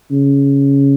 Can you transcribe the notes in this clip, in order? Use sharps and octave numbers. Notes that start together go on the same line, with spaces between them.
C#3